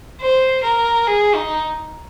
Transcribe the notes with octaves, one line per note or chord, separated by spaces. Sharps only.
C5
A#4
G#4
D#4